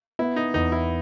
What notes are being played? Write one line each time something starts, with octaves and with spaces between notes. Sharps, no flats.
B3 E4
D#4
E2 D#4
E4